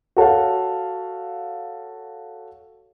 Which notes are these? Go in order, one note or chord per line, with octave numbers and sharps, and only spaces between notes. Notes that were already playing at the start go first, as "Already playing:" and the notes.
F#4 A4 C#5 F5